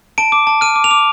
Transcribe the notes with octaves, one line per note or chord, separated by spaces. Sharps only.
A5 D7
D6
A5
F6 D#7
D6
F7
D6